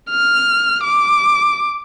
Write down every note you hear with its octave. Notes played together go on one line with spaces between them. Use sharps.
F6
D6